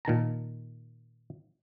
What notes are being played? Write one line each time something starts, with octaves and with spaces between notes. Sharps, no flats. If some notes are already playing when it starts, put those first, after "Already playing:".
A#2 D#3 A5 A#5